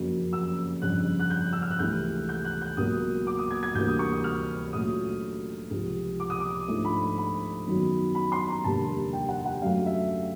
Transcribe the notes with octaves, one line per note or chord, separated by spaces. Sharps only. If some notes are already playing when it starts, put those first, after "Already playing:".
Already playing: F#1 F2 C#3 F#3 A#3
E6
G1 F2 C#3 F#6
F#6
G6
E6
F6
F#6
C#2 C3 E3 A3 G6
G6
F#6
G6
C#2 B2 F#3 A#3 D#6
D6
D#6
G#6
G#6
D2 C3 E3 G3 A#3 G6
D#6
C#6
D#6
F6
A#2 F#3 A3 C#4 D#6
C#2 C3 F3
D6
D#6
D6
G#2 F3 A3 D4 F4
B5
B5
F#2 D#3 F#3 B3
B5
C6
A#5
F1 D#2 D3 G3 A#3 A5
G5
F#5
F#5
F#2 D3 F#3 A3 F5
E5